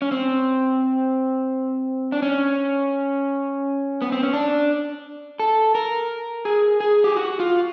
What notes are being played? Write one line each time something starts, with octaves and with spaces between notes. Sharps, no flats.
C#4
C4
D4
C#4
B3
C4
C#4
D4
A4
A#4
G#4
G#4
G4
F#4
F4